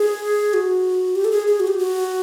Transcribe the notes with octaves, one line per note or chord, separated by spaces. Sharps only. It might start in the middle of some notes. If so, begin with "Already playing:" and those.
Already playing: G#4
F#4
G4
A4
G#4
G#4
F#4
G4
F#4